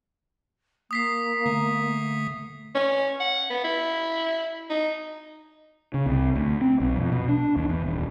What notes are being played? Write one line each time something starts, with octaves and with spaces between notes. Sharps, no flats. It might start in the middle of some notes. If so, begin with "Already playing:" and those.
A#3 D#6 B6 C7
D3 A3
C#4
F#5
B3
E4
D#4
C#3
C2
D2
C4
B1
F2
B2
D4
D#2
E2
D#1